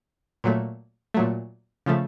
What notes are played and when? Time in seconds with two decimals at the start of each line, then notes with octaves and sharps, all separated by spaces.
0.44 A#2 F#3 A3
1.14 A#2 F#3 A3
1.86 C#3 F3 A3